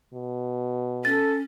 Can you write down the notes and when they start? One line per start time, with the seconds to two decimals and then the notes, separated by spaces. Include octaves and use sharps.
0.14 B2
1.05 C#4 A4 A6